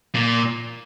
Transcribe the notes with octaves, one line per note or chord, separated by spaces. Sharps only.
A#2